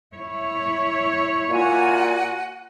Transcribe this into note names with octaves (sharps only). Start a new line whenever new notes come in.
E4 C#5
A#2 F#4 F#5 G#5